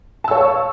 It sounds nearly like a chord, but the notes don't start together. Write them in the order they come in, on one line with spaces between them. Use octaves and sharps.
A5 E6 C#5 F5 C#6